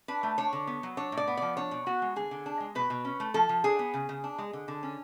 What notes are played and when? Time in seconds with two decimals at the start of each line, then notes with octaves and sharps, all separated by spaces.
0.08 D4 B4
0.23 A3
0.38 D4 C#5
0.53 D3
0.67 B3
0.83 F#3
0.97 D4 C#5
1.12 A2
1.17 D5
1.27 B3
1.37 F3 D5
1.57 D4 C#5
1.71 B2
1.86 B3 F#4
2.02 G#3
2.16 D3 G#4
2.31 D3
2.46 D4
2.60 G#3
2.75 B2 B4
2.90 B2
3.05 C#4
3.20 A3
3.34 F3 A4
3.49 F3
3.64 D4 G#4
3.79 B3
3.94 C#3
4.09 C#3
4.24 D4
4.38 G#3
4.53 D3
4.68 D3
4.83 C#4